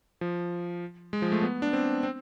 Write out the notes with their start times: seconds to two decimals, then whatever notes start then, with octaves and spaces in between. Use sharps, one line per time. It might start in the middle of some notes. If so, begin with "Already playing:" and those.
0.21 F3
1.13 G#3
1.22 F3
1.32 A3
1.42 B3
1.62 D4
1.73 C4
2.03 C4